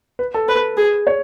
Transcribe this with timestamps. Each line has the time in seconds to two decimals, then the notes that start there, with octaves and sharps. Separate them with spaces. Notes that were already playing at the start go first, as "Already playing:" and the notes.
0.19 B4
0.34 A4
0.48 A4 B4
0.77 G#4
1.07 C#5